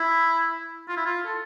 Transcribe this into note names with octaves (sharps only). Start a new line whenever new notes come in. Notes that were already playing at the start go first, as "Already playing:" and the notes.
Already playing: E4
F4
E4
F4
A4